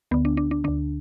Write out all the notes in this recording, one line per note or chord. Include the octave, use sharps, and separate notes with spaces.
D2 D3 B3
D4
D4
D4
D2 D3 D4